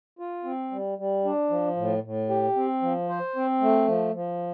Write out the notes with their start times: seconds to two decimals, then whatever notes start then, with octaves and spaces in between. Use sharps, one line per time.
0.19 F4
0.44 C4
0.71 G3
0.98 G3
1.24 D4
1.50 F3
1.77 A2
2.03 A2
2.29 G4
2.56 C4
2.82 F3
3.09 C5
3.36 C4
3.61 A3
3.87 F3
4.14 F3